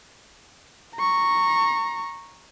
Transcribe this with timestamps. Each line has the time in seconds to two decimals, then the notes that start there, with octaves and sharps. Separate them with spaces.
0.95 A#5 C#6